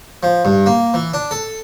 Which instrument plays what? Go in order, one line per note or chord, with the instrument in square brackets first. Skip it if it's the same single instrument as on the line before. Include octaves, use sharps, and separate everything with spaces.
[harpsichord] F3
G2
A#3
E3
D4
A4